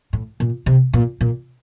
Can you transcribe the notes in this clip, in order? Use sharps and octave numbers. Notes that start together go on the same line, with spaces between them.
A2
A#2
C3
A#2
A#2